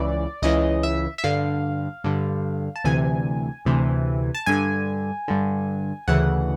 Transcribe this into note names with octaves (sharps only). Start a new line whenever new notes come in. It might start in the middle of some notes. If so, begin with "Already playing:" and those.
Already playing: C#2 C#3 E3 D5
C#2 C#3 E3 D#5
E5
E5
G2 D3 F5
G2 D3
A5
D2 C3 E3 G#5
D2 C3 E3
A5
G2 D3 G#5
G2 D3
D2 C#3 E3 F#5